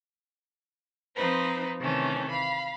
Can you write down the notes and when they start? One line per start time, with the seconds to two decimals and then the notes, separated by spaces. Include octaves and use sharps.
1.15 F3 C4 D#4 B4 C5
1.79 C3 D#3 E3 A3 C#4
2.30 F5 B5